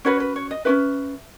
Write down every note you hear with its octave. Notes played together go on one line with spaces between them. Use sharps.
C#4 F#4 B4 C#5
B4
C#5
D#5
C#4 F#4 B4 E5